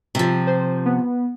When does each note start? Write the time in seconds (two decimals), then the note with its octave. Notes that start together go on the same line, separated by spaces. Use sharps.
0.15 C3 F3
0.47 C5
0.86 B3